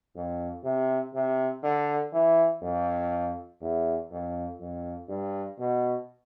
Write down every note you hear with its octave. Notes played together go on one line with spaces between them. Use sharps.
F2
C3
C3
D3
E3
F2
E2
F2
F2
G2
B2